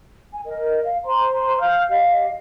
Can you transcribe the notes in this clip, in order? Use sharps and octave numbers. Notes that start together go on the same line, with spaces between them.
G#5
A#4 D#5
F5
C5 A#5 C6
F5 F6 G6
G4 D#5 F5